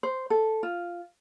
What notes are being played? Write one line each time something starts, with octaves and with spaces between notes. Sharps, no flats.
C5
A4
F4